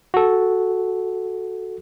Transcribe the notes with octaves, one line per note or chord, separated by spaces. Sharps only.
F#4 A4